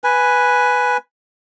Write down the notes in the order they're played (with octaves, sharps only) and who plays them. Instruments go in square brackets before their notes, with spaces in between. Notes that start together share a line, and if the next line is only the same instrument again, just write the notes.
[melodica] B4 G#5